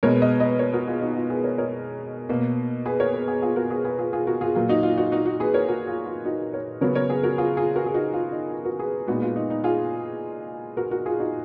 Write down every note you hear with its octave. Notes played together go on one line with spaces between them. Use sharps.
B2 G#3 B3 A#4 C#5
B4 D#5
B4 D#5
A#4 C#5
F#4 A#4
F4 G#4
D#4 F#4
F4
G#4 B4
A#4 C#5
A#4 C#5
B2 A#3
G#4 B4
A#4 C#5
G#4 B4
G#4 B4
F4 G#4
F#4 A#4
G#4 B4
G#4 B4
F4 G#4
F4 G#4
F#4 A#4
F4 G#4
A#2 F#3 A#3 F4
D#4 F#4
F4
D#4 F#4
D#4 F#4
D#4 F#4
G#4 B4
A#4 C#5
F#4 A#4
F4 G#4
F4
D#4 F#4
A#4 C#5
C#3 F#3 B3 A#4 C#5
A#4 C#5
G#4 B4
F#4 A#4
F4 G#4
F4 G#4
F#4 A#4
G#4
D#4 F#4
F4
D#4
F4
F#4 A#4
G#4 B4
A#2 G#3 B3 D#4 F#4
F4
D#4
D#4
F4 G#4
F#4 A#4
F#4 A#4
F4 G#4
D#4 F#4